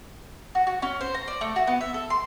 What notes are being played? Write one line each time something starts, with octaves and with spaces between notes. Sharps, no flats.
F#4
F#4
C#4
C5
A#5
D5
A3
F#4
B3
E5
A4
C6